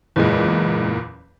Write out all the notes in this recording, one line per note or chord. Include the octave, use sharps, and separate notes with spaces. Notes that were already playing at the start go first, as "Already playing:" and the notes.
F#1 E2 A#2 E3 G#3